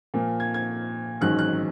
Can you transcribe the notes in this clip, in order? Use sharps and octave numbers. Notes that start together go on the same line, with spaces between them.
A#2 F3 A#3
G#6
G#6
A1 G#2 D#3 F#3 F#6
F#6